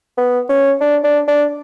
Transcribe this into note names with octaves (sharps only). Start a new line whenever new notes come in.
B3
C#4
D4
D4
D4